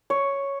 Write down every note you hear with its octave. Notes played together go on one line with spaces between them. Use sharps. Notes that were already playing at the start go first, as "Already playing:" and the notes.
C#5